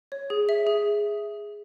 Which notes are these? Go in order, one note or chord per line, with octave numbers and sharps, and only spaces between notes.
C#5
G#4
E5
G#4